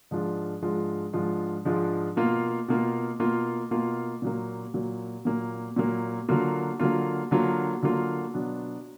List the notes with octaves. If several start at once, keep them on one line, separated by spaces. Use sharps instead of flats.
G#2 F3 G#3 D4 F4
G#2 F3 G#3 D4 F4
G#2 F3 G#3 D4 F4
G#2 F3 G#3 D4 F4
B2 A#3 F4
B2 A#3 F4
B2 A#3 F4
B2 A#3 F4
A#2 F#3 A#3
A#2 F#3 A#3
A#2 F#3 A#3
A#2 F#3 A#3
D3 F#3 A#3 F4
D3 F#3 A#3 F4
D3 F#3 A#3 F4
D3 F#3 A#3 F4
B2 F#3 B3 D4